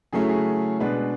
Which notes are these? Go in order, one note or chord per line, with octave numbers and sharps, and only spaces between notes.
C#3 F#3 A3 C#4 E4 G#4
G#4
B2 G#3 D4 G#4 B4